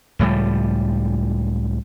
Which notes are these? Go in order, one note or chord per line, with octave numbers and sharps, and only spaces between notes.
C#2 A2 F3 G3